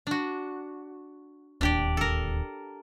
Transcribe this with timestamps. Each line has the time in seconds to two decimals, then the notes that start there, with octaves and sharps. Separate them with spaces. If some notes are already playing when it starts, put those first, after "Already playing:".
0.07 D4 F#4
1.61 D1 D#2 D4 G4 D5
1.97 A4 A#4